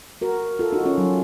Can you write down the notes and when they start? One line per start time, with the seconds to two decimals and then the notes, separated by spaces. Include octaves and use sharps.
0.21 F#4 A#4
0.59 F4 A4
0.72 D#4 F#4
0.86 C#4 F4
0.98 F#3